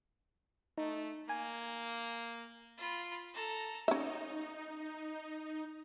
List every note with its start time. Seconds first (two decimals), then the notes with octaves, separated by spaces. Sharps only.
0.78 A3 D#4
1.29 A#3 G#5
2.77 F4 B5
3.33 A4 A#5
3.88 C#4 D#4 E5